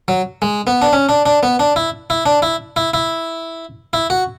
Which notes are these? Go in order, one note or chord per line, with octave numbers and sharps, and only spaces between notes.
F#3
G#3
B3
D4
C#4
D4
D4
B3
D4
E4
E4
D4
E4
E4
E4
E4
F#4